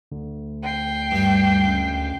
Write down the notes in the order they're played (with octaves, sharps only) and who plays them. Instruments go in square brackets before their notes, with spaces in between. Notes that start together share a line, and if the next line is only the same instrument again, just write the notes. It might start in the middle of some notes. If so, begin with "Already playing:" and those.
[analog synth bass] D2
[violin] G5 C7
[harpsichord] G2 G3
C#2